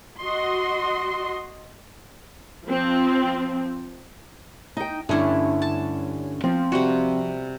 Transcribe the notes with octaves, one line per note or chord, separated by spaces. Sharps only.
F#4 D#5 C6
F3 C4
D#4 G5
G2 D3 A3 C#4 D4 E4
A5
F3 C4
C3 G3 F#4